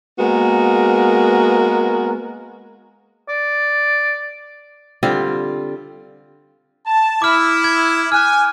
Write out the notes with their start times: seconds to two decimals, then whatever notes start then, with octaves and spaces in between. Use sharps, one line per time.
0.18 G#3 A#3 B3 F#4 A#4
3.29 D5
5.03 D3 G3 C4 F4
6.86 A5
7.22 E4 D6 F6
7.64 G#6
8.12 G#5 F6 F#6